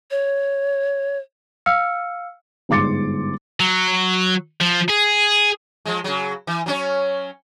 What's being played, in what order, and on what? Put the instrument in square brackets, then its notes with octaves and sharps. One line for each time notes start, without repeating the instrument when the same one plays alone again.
[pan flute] C#5
[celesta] F5 E6 F6 C#7
[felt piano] G1 G#2 C6 D6 A6 C#7
[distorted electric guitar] F#3
F3
G#4
[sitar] F3 G#3
C#3 F#3
E3
F#3 C#4 C#5